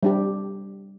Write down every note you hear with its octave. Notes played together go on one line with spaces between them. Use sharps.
G3 D4 G4